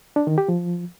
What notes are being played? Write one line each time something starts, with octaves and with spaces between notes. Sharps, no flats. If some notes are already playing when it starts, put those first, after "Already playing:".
D4
D#3
G4
F3